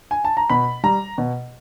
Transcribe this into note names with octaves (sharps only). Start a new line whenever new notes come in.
G#5
A5
A#5
B2 B5
G3 A#5
B2